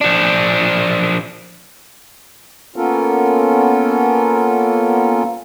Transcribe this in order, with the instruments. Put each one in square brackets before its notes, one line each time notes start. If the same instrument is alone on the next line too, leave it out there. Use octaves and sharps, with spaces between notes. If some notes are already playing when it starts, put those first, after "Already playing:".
[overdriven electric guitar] F3 D4
[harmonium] A#3 B3 C#4 F4 A4 A#4